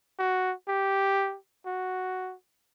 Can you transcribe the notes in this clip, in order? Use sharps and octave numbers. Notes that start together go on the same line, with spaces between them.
F#4
G4
F#4